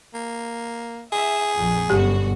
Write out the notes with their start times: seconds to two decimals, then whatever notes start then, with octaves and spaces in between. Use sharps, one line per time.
0.14 A#3
1.12 G#4 E5
1.55 A#1 F2
1.90 G1 F#2 B2 F#4 G4